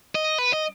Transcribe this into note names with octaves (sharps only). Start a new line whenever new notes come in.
D#5
B4
D#5